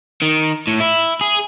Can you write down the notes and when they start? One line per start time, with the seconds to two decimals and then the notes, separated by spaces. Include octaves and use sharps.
0.22 D#3
0.67 A2
0.80 E4
1.21 G#4